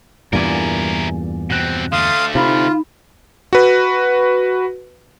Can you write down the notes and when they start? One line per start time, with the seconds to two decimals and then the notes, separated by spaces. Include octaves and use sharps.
0.33 E2 G2 A#2 E4 A#4 D5 G#5 D6
1.50 B2 C4 F#6 A#6
1.93 D3 A3 F5 C6 D#6
2.35 C3 D#4 F4 B5
3.53 F#4 B4